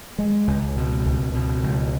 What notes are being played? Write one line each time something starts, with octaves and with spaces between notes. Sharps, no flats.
G#3
C#2
B2
C#2
B2
C#2